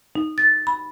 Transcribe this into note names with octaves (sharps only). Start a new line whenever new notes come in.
D#4
A6
B5